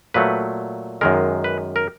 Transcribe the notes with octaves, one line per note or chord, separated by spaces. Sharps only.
A#2 F#3 A3 B4
F#2 D#3 G#3 A#4
B4
A#4